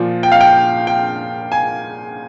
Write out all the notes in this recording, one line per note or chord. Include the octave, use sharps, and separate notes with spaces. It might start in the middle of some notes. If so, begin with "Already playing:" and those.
Already playing: A#2 F3
G5
F5
G5
G5
G#5